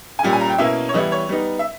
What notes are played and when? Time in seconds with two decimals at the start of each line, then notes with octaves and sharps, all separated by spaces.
0.19 G#5
0.23 A#2 G3 C#4 G5
0.33 G#5
0.41 A#5
0.50 G5
0.58 B2 A#3 C#4 E4 E5
0.89 C#5
0.94 E3 G3 B3 E4 D#5
1.12 C#5
1.29 G3 B3 D#4
1.59 E5